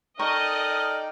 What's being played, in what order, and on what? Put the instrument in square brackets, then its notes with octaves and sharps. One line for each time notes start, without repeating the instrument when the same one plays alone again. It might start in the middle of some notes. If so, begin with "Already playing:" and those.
[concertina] D#4 G5 [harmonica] A4 D5 F6 [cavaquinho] A#4 C#6 [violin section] D#5